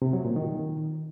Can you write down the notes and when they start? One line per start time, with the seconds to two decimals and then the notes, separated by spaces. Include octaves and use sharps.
0.02 C3
0.13 F#3
0.25 A#2
0.36 D#3